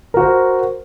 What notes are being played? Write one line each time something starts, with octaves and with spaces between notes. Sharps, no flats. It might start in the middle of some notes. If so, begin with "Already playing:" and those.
F#4 A#4 C5